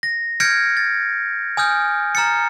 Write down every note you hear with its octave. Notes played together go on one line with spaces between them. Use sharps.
A#6
F6 G6 G#6 A#6 C#7 D7
A6
G#5 D#6 F6 G6
A#5 F6 A6 C#7